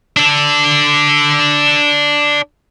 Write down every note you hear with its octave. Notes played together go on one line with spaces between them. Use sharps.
D4 A4